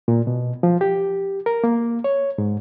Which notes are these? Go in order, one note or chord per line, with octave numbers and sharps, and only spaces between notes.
A#2
B2
F3
G4
A#4
A#3
C#5
G#2